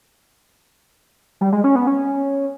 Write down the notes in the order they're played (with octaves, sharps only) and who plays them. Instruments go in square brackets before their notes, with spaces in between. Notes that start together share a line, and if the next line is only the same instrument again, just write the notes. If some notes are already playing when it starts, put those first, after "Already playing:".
[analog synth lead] G3
G#3
C#4
B3
C#4